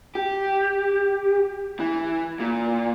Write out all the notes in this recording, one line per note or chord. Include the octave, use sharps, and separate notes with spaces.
G4
E3
A#2